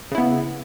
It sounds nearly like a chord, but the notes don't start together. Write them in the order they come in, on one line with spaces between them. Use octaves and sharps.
C#3 E4 B3